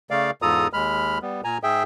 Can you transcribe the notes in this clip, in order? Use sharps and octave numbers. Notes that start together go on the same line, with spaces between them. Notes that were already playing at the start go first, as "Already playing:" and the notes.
C#3 A3 D5 F5
E2 G#2 F4 A4 A#5 D#6
D#2 G#3 B5 F6
G3 B3
A#2 G#5 A#5
G#2 G#4 E5 G5